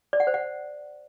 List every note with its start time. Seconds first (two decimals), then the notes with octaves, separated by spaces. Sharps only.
0.13 D5
0.20 F#5
0.27 C5
0.34 F#5